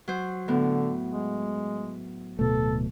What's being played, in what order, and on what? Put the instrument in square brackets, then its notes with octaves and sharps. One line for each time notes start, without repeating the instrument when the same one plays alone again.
[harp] F#3 C5
[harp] A2 B3 [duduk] D3
[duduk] G#3
[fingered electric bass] D1 B2 A3 [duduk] A4